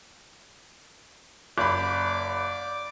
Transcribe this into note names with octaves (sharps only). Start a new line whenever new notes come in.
F#1 D5 B5 D6